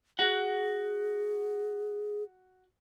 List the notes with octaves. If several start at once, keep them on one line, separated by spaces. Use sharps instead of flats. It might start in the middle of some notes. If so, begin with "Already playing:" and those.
F#4 G#4 F#5